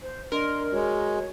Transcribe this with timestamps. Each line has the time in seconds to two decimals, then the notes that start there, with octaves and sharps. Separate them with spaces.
0.02 C5
0.32 D4 A#4 D5 D#5 C6
0.72 G#3 F#4 C#5